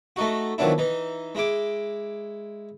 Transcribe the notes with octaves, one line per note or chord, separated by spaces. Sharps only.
A3 D#4 F#4
D#3 F3 F#3 B3 D4 E4
E3 D#4
G#3 E4 D6